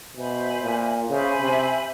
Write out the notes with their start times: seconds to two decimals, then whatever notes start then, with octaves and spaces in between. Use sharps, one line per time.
0.16 B2 C5 E5 G#5 B5
0.63 A#2
1.09 C#3 C5 E5 G#5 B5
1.40 C3